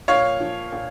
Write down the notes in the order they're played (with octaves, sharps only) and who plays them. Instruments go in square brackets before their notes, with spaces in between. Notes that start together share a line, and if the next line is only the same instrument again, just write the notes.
[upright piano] A#2 C#5 F5
F3
A#2